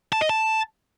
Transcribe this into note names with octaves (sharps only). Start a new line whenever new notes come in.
A5
D#5
A5